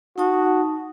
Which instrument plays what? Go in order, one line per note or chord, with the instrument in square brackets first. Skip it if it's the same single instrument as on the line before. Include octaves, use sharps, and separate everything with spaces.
[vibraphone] D#4 A5 D#6 [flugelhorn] F#4